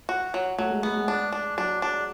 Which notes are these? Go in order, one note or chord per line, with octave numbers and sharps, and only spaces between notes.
F#4
F#3
F#3 A3
G#3
G#3 B3
G#3
D4
D4
F#3 D4
D4